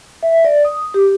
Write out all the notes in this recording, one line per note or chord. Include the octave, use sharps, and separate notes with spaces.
E5
D5
D#6
G4